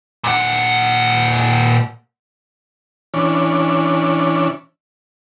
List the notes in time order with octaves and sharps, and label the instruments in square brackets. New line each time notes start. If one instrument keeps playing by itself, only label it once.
[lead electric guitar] A#2 F#5
[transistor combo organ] E3 C#4 D4